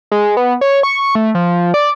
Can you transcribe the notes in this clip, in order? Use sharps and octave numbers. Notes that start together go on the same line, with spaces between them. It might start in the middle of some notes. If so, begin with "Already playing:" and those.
G#3
B3
C#5
C#6
A3
F3
D5